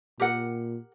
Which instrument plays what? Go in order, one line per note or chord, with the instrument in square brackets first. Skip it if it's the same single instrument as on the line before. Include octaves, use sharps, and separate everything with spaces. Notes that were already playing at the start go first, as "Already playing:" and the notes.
[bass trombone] A#2 [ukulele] G4 A#4 F#5